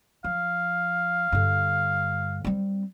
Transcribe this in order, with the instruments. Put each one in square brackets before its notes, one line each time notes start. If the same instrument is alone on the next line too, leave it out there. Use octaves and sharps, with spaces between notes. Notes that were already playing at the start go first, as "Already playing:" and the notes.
[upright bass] F3 [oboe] F5
[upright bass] G2 D3
G3 C4